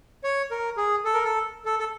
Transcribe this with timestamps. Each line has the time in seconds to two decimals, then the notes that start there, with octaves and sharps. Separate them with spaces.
0.24 C#5
0.51 A#4
0.77 G#4
1.05 A4
1.14 A#4
1.25 A4
1.65 A4
1.79 A4